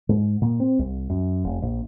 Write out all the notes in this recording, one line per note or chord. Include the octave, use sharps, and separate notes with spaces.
G#2
A#2
C4
C2
F#2
F1
A#1